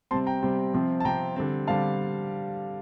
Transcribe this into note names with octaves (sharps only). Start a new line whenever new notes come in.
C3 G3 C4 A5 C6
G5 A#5
C3 G3 C4
C3 F3 C4
A5
C3 F3 C4 G5 A#5
D3 G3 C4
D3 G3 C4 F5 A5